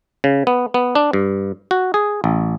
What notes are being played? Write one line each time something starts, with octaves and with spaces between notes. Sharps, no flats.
C#3
B3
B3
D4
G2
F#4
G#4
A1